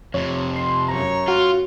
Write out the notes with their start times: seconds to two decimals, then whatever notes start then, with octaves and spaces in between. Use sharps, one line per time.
0.14 F2 C3 C#5
0.56 C6
0.88 F#2 C#5 A#5
1.28 F4 F#4